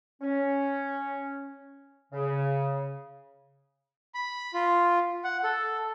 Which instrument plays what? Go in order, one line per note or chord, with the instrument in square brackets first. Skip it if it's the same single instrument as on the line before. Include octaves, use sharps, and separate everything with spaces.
[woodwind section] C#4
C#3
[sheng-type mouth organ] B5
F4
F#5
A4